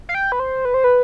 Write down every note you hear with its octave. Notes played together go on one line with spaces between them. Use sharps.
F5
G5
B4
C5
B4
C5
B4